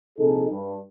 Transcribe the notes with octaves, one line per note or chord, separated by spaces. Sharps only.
A#1 C3 D#4 G#4 A4
G2